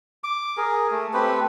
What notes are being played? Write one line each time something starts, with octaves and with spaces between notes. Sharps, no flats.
D6
G#4 A#4
A3
A3 C4 G4 B4